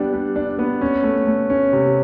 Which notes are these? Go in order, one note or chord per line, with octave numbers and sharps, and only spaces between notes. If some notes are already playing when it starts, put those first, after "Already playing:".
Already playing: G3 B3 D4
G3
D4
B3
C#4
A3
A3
C#4
C3